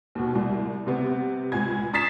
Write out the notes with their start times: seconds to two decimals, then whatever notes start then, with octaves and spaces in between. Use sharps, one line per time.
0.15 D#2 B2
0.35 C2
0.87 C3 B3
1.52 C#2 G#5 G#6
1.93 A#5 D#6 A6 B6 C7 E7